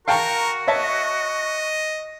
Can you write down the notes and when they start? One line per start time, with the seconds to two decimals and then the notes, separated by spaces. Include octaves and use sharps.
0.08 F#4 A#4 F5 G5 A5 C#6
0.68 C#5 D#5 E5 A5